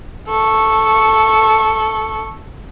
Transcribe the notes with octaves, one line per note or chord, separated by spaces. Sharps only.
A4 C#6